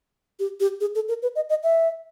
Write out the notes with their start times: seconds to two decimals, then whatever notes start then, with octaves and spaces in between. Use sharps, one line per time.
0.39 G4
0.60 G4
0.81 G#4
0.95 A4
1.08 A#4
1.22 B4
1.35 D#5
1.50 D#5
1.63 E5